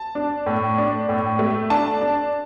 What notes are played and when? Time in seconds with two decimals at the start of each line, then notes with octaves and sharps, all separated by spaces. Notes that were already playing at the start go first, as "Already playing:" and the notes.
Already playing: A5
0.15 D4
0.46 A2
0.78 D4
1.09 A2
1.39 A3
1.70 D4 A5
2.01 D4